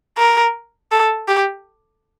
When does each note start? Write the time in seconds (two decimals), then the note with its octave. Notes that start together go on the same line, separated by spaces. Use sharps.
0.18 A#4
0.92 A4
1.28 G4